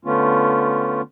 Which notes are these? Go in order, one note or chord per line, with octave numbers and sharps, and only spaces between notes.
D3 A3 B3 C#4 F4